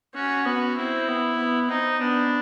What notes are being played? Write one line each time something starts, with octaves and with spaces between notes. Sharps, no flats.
C#4 F#4
B3 F#4
C4 E4
B3
B3
C4 D#4
B3 D4